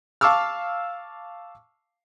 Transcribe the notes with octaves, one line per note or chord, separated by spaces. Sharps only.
F5 A5 C#6 D6 E6 F6